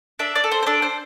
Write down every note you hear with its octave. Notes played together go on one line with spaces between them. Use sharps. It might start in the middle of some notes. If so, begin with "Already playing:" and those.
D4 E5
D5
A4
C5
C5
D4 A4
C5